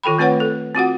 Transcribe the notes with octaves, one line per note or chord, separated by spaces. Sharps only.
D#3 F4 A4 G5 B5
A3 C4 F4 B4 C#5 F#5
A4
C4 F4 F#4 F#5